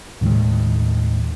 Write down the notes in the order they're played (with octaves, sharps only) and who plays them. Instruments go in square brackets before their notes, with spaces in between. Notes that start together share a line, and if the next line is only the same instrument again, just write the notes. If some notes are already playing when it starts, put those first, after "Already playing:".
[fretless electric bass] D#2 A2 D#3 G#3